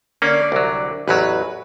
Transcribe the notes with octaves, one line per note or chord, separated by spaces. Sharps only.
D3 A#3 C#4 D5
C2 F#3
A1 E2 F#3 B4